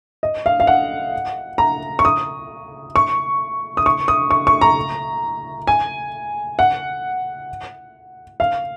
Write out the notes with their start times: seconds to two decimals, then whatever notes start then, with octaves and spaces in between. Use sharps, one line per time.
0.23 D#5
0.46 F5
0.60 F5
0.67 F#5
1.58 A#5
1.99 C#6
2.05 D#6
2.96 C#6
3.77 D#6
3.86 C#6
4.08 D#6
4.31 C#6
4.47 C#6
4.61 A#5
5.67 G#5
6.59 F#5
8.40 F5